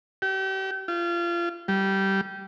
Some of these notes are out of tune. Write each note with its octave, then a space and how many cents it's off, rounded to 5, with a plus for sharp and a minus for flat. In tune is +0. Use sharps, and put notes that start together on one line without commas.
G4 -35
F4 -30
G3 -15